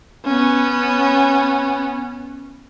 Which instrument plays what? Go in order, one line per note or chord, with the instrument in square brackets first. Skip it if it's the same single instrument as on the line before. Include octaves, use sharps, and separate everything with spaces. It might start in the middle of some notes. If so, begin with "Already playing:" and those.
[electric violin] B3 C#4